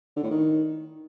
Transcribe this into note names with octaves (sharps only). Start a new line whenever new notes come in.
D3
A2
D#3